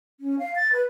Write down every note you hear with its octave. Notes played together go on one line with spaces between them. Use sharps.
C#4
F5
A6
B4